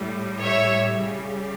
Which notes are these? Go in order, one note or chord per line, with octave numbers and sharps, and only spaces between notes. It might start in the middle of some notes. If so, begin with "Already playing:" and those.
Already playing: A2 G3
C#5 E5
C#3 G3